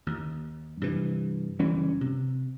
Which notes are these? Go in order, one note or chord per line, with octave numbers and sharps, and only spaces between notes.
D#2
G2 C3 E3
F#1 E3 G3 C#4
C3